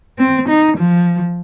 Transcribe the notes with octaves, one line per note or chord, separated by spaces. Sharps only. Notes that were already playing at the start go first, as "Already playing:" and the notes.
C4
D#4
F3